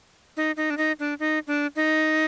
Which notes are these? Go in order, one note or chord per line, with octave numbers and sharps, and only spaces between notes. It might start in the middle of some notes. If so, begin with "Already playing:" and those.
D#4
D#4
D4
D#4
D4
D#4
D4
D#4